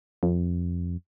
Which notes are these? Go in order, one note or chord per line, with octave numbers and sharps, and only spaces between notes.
F2